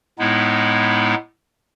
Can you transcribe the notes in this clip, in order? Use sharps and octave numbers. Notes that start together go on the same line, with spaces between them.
A2 G#3 B3 D#4 E4